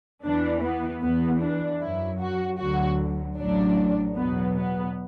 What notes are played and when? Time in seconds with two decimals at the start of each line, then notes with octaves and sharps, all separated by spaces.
0.24 E2 E3 D4
0.63 B3
1.02 E2 E3 B3
1.42 D4
1.81 F#2 F#3 E4
2.20 F#4
2.59 D2 D3 F#3 F#4
3.38 A1 A2 F#3 D4
4.16 E2 B2 F#3 B3
4.56 B3